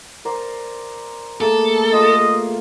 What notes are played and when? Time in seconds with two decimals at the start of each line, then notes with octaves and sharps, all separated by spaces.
0.25 A#4 C5 D5
1.41 A3 A#3 G#4 A4
1.93 F4 D#5